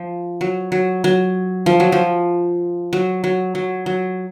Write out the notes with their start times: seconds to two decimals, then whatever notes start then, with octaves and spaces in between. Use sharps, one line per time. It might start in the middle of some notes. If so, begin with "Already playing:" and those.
Already playing: F3
0.41 F#3
0.72 F#3
1.04 F#3
1.66 F3
1.80 F#3
1.92 F3
2.93 F#3
3.24 F#3
3.55 F#3
3.86 F#3